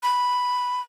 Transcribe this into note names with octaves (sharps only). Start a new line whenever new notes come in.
B5